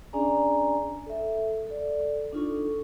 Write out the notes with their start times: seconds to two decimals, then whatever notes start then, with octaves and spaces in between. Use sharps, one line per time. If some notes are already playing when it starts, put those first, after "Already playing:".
0.13 C#4 D4 G#4 D5 G#5 A#5
1.06 A4 E5
1.67 A4 D5
2.33 D4 D#4 F4 A4 C#6